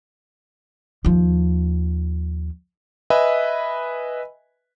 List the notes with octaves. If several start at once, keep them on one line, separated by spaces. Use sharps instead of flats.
D#2 F3
B4 D#5 E5 G#5 B5